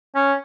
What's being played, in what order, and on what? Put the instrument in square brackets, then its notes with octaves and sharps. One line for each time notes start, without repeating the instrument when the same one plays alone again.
[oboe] C#4